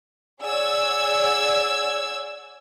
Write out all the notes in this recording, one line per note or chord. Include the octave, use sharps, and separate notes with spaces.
G#4 C#5 D5 F#5 E6 G#6